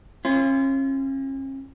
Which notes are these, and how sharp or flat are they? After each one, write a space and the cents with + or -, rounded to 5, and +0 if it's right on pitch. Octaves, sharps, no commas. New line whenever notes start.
C#4 -40 F4 -30